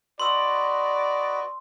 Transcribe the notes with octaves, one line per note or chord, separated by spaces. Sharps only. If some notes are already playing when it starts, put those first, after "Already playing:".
F#4 B4 D5 D#5 C6 E6